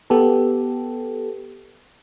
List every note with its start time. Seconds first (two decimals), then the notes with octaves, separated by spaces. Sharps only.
0.10 B3 G4 A4